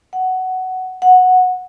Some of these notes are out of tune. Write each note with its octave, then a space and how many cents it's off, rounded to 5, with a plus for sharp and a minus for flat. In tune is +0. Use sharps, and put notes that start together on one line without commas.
F#5 +10
F#5 -10